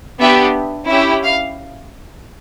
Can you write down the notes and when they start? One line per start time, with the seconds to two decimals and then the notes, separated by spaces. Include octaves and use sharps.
0.20 B3 D4 G4 E5
0.88 C#4 E4 G4 E5
1.23 F5